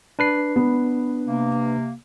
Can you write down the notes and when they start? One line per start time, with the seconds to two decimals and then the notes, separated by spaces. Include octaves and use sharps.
0.19 D4 B4 C7
0.56 B3
1.27 C3 A#3